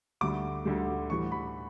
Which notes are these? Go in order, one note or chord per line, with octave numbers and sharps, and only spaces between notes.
D2 D3 G3 D6
D2 D3 G3
A2 E3 G3 C#6
B5